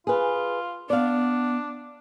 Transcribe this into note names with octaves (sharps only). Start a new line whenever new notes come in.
F4 G#4 B4
B3 D4 D5 F5